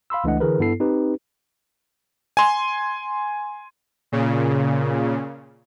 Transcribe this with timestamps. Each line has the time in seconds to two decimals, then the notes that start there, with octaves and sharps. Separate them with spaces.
0.10 F5 B5 C6 E6
0.24 C#2 E3 A3 D4 D#5 F#5
0.40 D3 E3 G#4 A#4 B4
0.59 G2 B3 E4 A4 C7
0.80 C4 D#4 G4 B4
2.37 G#5 C6
4.12 A#2 C#3